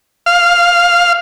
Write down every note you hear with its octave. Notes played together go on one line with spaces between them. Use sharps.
F5